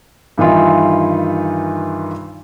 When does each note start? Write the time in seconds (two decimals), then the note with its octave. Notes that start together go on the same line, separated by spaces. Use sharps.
0.38 G2 D#3 E3 F4